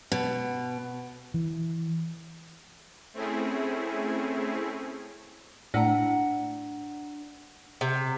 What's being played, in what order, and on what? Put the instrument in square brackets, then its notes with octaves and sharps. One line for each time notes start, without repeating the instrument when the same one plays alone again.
[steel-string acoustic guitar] B2
[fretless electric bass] E3
[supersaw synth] A3 C4 C#4 E4 G#4
[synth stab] A2 [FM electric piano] D4 [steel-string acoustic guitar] F#5 A#5
[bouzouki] C3